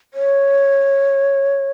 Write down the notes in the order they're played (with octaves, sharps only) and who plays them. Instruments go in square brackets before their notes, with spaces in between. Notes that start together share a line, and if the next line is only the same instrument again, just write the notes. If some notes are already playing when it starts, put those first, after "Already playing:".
[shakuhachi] C#5